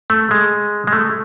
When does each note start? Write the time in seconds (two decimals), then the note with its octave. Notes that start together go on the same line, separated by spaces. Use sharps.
0.10 A3
0.31 G#3
0.87 G#3
0.92 A3